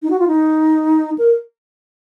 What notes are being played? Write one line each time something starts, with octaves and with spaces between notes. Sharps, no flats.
D#4
F#4
F4
D#4
A#4